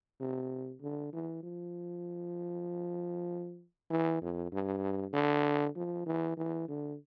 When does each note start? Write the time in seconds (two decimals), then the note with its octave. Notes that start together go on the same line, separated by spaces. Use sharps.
0.21 C3
0.81 D3
1.13 E3
1.43 F3
3.90 E3
4.22 F2
4.52 G2
5.13 D3
5.76 F3
6.06 E3
6.37 E3
6.68 D3